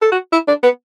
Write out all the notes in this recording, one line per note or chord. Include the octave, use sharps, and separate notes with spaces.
A4
F#4
E4
D4
B3